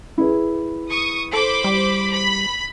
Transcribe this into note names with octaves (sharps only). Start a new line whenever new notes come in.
E4 G#4 B4
C#6 D#6
A4 C5 B5 D6
G3
B5